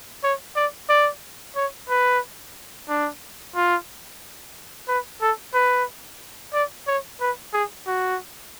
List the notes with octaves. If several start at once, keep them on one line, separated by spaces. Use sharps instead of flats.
C#5
D5
D5
C#5
B4
D4
F4
B4
A4
B4
D5
C#5
B4
G#4
F#4